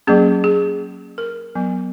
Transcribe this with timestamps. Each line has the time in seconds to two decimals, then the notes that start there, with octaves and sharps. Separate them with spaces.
0.07 F#3 A#3 C#4 G#4
0.44 G#4
1.18 A#4
1.55 F#3 B3